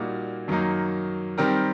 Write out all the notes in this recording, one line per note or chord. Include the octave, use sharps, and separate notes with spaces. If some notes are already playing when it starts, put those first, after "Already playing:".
Already playing: A#2 G3 A#3 D#4 F#4
F#2 D#3 F#3 A#3 D#4
D#3 G3 C4 G4 A#4